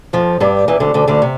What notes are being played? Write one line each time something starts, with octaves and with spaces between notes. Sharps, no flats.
F2 F3
G2 G3
E2 E3
D2 D3
D2 D3
D2 D3
C3